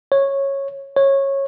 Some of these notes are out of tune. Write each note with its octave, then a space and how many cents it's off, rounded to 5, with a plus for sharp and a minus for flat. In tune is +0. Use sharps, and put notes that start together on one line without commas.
C#5 -10
C#5 -15